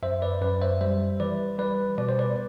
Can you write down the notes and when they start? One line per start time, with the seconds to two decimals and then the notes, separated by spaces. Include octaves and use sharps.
0.03 F#2 C5 E5
0.22 B4 D5
0.42 F#2 B4 D5
0.61 C5 E5
0.81 G3 C5 E5
1.20 E3 B4 D5
1.59 G3 B4 D5
1.98 B2 D5
2.09 C5
2.19 B4 D5